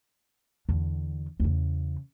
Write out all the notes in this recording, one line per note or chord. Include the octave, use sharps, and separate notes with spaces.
E2 D3
E2 C#3